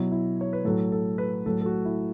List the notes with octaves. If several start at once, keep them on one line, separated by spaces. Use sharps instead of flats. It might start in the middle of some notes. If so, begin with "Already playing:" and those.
Already playing: B2 F#3 E4
E4
C#5
B4
A2 F#3 A4
A4
B4
A2 F#3 A4
A4
F#4
E4